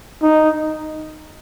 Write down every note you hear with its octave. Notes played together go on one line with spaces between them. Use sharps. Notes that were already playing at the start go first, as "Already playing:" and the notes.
D#4